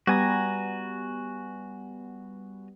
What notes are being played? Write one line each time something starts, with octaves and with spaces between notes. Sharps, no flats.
G3 B3 F#4 G#5 A#5